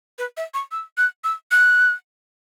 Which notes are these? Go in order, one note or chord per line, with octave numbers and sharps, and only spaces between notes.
B4
E5
C#6
E6
F#6
E6
F#6